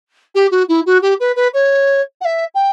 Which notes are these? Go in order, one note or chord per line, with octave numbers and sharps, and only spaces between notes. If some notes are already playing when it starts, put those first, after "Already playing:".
G4
F#4
E4
F#4
G4
B4
B4
C#5
F#5
E5
G5